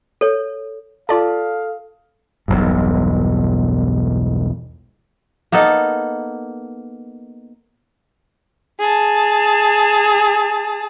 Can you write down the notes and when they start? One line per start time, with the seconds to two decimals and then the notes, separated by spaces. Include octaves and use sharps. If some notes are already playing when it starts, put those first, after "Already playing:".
0.21 A4 C#5
1.09 F4 A4 D5 F5 A5
2.48 E1 B1 G2
5.52 A#3 B3 D#4 A4
8.79 G#4 A5